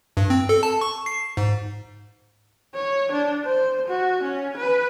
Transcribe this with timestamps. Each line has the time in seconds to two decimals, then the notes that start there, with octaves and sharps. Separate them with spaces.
0.17 G2
0.30 C4
0.49 A4
0.63 A5
0.81 C#6
1.06 C7
1.37 G#2
2.75 C#5
3.12 D4
3.45 C5
3.88 F#4
4.23 C#4
4.57 B4